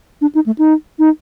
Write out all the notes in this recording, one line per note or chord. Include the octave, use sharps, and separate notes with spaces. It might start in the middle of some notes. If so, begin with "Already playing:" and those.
D4
D#4
A3
D#4
D#4